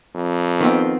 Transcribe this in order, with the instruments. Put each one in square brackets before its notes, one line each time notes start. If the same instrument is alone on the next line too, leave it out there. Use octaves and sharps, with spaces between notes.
[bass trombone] F2
[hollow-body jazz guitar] D#3 B3 C4